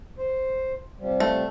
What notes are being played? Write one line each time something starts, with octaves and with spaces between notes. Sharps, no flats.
C5
C3 F3 G3
A3